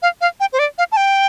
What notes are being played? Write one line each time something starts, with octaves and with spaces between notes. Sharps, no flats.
F5
F5
G5
C5
D5
F5
A5
G5